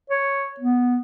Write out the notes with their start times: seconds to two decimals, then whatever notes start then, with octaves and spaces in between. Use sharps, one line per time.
0.10 C#5
0.60 B3